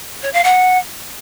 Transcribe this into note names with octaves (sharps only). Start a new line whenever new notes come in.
C#5
F5
F#5